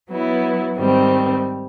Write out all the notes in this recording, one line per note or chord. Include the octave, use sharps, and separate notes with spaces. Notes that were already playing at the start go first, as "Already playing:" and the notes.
F#3 B3 E4
G#2 D#3 G3 C4